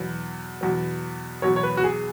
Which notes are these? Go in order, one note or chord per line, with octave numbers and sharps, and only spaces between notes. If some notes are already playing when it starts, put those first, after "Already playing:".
Already playing: E2 B2 F#3
E2 B2 F#3
E2 B2 F#3 C#5
C#5
B4
F#4
G#4